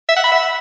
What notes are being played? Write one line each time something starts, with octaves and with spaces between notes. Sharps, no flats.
E5
F#5
B5
E5